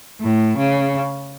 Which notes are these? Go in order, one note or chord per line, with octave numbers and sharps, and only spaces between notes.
A2
C#3